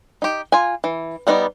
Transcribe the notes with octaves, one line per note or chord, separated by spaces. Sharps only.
D#4 G4
F4 G#5
E3
G3 B3 D#4 B4 D5